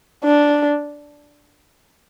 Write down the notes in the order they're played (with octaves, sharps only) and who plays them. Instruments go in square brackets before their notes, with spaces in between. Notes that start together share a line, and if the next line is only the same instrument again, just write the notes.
[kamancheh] D4